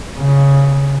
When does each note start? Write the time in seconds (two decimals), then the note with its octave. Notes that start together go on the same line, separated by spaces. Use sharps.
0.20 C#3